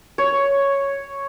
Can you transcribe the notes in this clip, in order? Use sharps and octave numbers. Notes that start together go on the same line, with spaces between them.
C#5